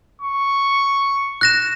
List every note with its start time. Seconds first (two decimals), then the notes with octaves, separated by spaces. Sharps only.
0.22 C#6
1.41 F#6 A#6 E7